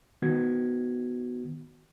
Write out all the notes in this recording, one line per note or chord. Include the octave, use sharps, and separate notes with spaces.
D#3 B3 F#4 G#6